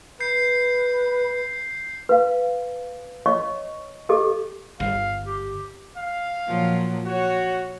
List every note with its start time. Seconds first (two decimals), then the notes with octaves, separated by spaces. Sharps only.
0.20 B4 G6 C7
2.09 B4 F5
3.26 C#5 D#5 C#6
4.09 G4 A4 D#5 D6
4.80 G1 F5
5.26 G4
5.97 F5
6.47 A#2 F3 F#3
7.06 F#4 C#5